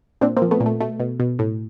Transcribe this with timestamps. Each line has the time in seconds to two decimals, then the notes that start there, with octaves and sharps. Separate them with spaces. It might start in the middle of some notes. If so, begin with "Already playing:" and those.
0.21 A#2 C4 D4
0.37 A#3 C4
0.42 F3
0.51 A3 B3
0.60 A#2
0.66 A3
0.81 B2 A3
1.00 B2
1.20 B2
1.39 A2